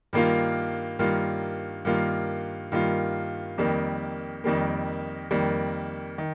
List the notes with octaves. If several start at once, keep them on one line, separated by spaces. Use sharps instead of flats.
G2 D#3 A#3 F4
G2 D#3 A#3 F4
G2 D#3 A#3 F4
G2 D#3 A#3 F4
F2 D#3 G3 A#3
F2 D#3 G3 A#3
F2 D#3 G3 A#3
D#3